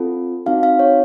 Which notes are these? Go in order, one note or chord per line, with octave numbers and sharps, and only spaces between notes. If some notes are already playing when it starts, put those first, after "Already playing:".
Already playing: C4 F4 A4
C4 D#4 F#4 F5
F5
C#5